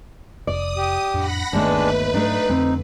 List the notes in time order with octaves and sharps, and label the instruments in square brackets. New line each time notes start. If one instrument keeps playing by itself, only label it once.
[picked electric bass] F1 [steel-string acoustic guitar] D5 [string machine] D#6
[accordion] G4
[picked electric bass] F2 A2 D4 [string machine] F#5 B5 A#6
[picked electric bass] G1 D#3 B3 [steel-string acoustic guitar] D#2 A3 [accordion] G#3 D4 [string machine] B4
[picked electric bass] G#2 F#3 [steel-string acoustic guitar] A3 D4 [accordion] D#4
[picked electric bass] F2 D3 [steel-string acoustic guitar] C4